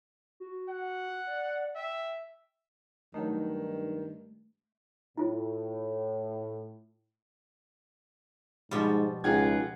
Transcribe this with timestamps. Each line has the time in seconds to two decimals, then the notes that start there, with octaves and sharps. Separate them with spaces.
0.40 F#4
0.69 F#5
1.27 D5
1.75 E5 G5
3.14 G2 D#3 F#3 A3 D#4
5.17 A2 E4 F4
8.71 G#2 B2 F3 G3
9.24 C#2 D#4 F4 G#4 F#5 G5 G#6